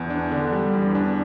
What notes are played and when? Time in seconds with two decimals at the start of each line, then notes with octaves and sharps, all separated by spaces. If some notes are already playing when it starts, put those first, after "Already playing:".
Already playing: E2
0.10 D4
0.31 D3
0.52 G3
0.73 E2
0.95 D4